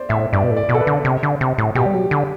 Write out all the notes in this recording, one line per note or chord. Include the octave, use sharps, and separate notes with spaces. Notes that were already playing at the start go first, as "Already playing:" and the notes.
Already playing: C5 D5
A2 E5
G2 D5
B2
A2
D5
B2
A4
B4
D3
C3
D3
C3
A2
B2 G4
G3
F#3
D3